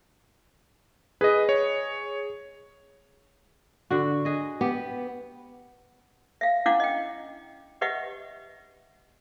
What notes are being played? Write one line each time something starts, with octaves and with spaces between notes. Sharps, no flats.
G#4 B4 D#5
C#5
D3 F#4
G#4 D#5
B3 G4
E5 F5
C#4 D4 E4 F5 F#5 D6
D#5 G5
G4 B4 D#5 E5 F#5 C#6